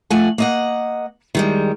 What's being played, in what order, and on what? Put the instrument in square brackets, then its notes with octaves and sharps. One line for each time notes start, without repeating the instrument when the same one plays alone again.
[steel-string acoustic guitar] F3 A3 F#5 G#5
A#3 D#5 F#5
D#3 G3 G#3